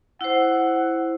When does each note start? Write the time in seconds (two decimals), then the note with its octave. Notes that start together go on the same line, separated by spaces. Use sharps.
0.21 E4 C5 F#5